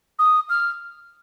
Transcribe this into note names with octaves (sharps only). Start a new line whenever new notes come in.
D#6
F6